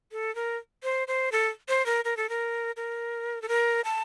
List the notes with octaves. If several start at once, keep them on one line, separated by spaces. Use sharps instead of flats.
A4
A#4
C5
C5
A4
C5
A#4
A#4
A4
A#4
A#4
A4
A#4
A5